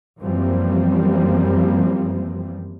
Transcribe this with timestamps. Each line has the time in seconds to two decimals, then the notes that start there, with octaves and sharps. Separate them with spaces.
0.21 F#2 E3 F3 G3 A#3 C4